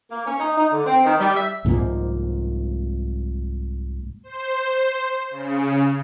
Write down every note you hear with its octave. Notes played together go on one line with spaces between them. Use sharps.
A#3
C#4
D#4
D#4
D3
C4
D#3
G3
E5
C2 G#2 F3 A#3
C5
C#3